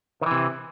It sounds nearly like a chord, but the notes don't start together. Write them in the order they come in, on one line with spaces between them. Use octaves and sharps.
D#3 E3 C3